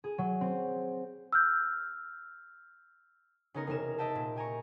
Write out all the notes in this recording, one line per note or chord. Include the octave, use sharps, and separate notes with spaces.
G#4
F#3
C4
E6 F6 G6
C#3 B3 C#4 D#4 A#4
E1 C3 D#4 A#4 G#5 E7
D#5 E5 G5 A5
A#2
G4 G#5 A#5 C#6